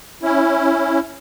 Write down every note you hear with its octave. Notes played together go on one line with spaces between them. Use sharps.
C#4 E4